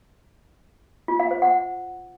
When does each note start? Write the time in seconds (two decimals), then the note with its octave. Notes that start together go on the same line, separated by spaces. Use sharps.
1.08 F4
1.20 F5
1.31 C5
1.42 F#5